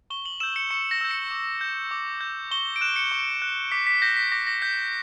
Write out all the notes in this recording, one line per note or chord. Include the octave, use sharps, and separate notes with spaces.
C#6 G7
F#7
E6 G6 E7
C#7
C#6 C#7
A#6
E6 G6
C#7
D6
G6
D6
G6
C#6 G7
D7
F#6 E7
C#7
C#6
F#6
D6 B6
B6
G6 A#6
B6
D6 A#6
A#6
G6 B6